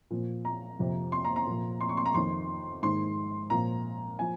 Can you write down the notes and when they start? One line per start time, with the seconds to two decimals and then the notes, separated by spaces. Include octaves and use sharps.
0.10 A#2 F3
0.45 A#5
0.79 F2 C3 F3
1.12 C6
1.25 A#5
1.36 A#5
1.47 A#2 F3
1.81 C6
1.89 C#6
1.97 C6
2.06 A#5
2.14 F2 D#3 C6
2.82 G#2 D#3 C6
3.50 A#2 F3 A#5
4.19 F3 G#5